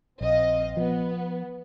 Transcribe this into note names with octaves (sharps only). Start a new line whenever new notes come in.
A#1 C4 D#5 F5
F3 B3